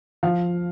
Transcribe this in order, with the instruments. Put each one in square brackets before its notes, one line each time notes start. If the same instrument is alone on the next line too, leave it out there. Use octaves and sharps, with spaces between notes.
[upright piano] F3 F5